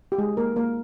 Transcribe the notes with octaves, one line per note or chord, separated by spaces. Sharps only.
G4
G#3 G#4
A#3 A#4
A#3 A#4